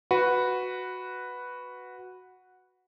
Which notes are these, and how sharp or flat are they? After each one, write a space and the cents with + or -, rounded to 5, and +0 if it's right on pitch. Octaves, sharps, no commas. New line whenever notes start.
F#4 -5 B4 +0